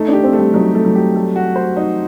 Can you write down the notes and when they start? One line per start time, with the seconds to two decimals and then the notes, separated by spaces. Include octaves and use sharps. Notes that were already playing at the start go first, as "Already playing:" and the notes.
Already playing: A3 D#4
0.08 D4 G4
0.24 C4
0.33 A3
0.39 G3
0.54 F#3 D#4
0.75 A3
0.85 F#3
0.95 G4
1.16 A3
1.36 F#4
1.56 C5
1.76 D#4